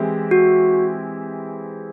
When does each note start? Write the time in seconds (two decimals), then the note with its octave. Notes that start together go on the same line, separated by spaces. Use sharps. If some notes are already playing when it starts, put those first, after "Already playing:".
Already playing: E3 G#3 C4 E4 G4
0.31 F#4